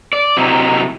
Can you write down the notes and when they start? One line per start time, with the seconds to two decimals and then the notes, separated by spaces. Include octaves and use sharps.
0.13 D5
0.37 C3 F#3 D#4 E4